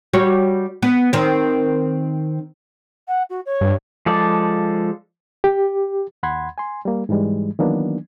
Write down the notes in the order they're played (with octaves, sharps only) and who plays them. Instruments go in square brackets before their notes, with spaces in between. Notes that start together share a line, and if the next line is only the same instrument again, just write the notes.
[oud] G3 F#4 C#5
B3
D#3 C4
[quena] F#5
F#4
C#5
[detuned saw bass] G2
[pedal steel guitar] F3 G#3 A4 D5
[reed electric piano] G4
D#2 F#5 B5 C6 G#6
G#5 C6
G3 A#3
G#2 E3 G3 G#3
D#3 E3 F#3 A#3 B3 D4